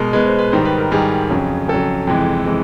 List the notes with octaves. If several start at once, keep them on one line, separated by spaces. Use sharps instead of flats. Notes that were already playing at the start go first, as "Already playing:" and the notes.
Already playing: B2 G#3 A#4
B2 G#3 B4
C5
B4
G#2 D#3 G3 C5
B4
A#4
G#2 D#3 G3 G#4
F2 C#3 F#3
F2 C#3 F#3 A4
F2 C3 E3 G#3
C3 E3 G#3